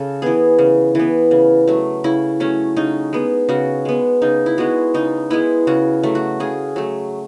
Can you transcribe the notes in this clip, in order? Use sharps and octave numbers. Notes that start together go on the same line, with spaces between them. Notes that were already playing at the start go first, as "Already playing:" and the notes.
Already playing: C#3 A4
E3 B3 G#4
C#3
E3 B3
C#3
F#3 A3
C#3 E4
F#3 A3 C#4
C#3 D#4
G#3 B3
C#3 F#4
G#3 B3
C#3 D#4
E4
G#3 B3 F#4
C#3 D#4
G#3 B3 E4
C#3 F#4
F#3 A3
F#4
C#3 G#4
F#3 A3